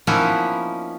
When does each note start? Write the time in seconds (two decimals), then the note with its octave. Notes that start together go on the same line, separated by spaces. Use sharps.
0.07 F3 A#3 B3 C#4 D#4 E4